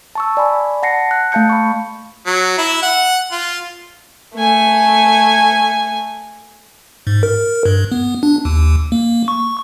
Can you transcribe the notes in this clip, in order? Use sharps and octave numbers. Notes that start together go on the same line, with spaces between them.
A5 C#6 E6
D5 G#5 B5
F#5 A5 A#6 C7 C#7
F#6
A3 F5 A5 G6 C#7
B5 C#6
F#3
E4
F#5
F4
A3 G#5
G#2
A#4
G2
B3
D4
D#2
A#3
C#6